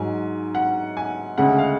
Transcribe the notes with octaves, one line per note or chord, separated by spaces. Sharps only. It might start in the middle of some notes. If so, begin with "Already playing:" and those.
Already playing: G#2 F#3 G#5
F#5
G#5
D2 C#3 G#3 F#5
F5